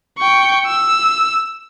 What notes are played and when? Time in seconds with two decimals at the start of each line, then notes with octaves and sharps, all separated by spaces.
0.19 G5 C#6
0.66 E6